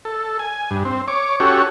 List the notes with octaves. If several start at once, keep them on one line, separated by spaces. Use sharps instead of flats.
A4
G#5
G2
C4
C#5 D6
C#4 F#4 G4 A4 C#5